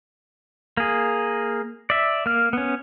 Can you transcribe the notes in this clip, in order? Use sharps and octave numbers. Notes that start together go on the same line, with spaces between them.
A#3 G#4
D5 E5
A#3 F6
B3 C#4